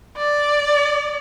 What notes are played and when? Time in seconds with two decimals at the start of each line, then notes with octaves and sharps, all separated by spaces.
0.17 D5